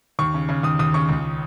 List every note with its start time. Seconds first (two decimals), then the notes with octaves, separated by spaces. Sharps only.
0.19 D#2 C#6
0.34 C#3
0.49 C#3
0.63 D#2 D#6
0.79 D#2 D#6
0.94 C#3 C#6
1.09 C#2